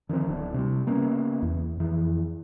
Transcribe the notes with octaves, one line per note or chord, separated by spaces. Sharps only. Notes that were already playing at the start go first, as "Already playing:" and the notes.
D3 D#3 F3 C4
D1 B3 D4
C3 G3
C#3 A#3 B3 C#4
E2
F2 E3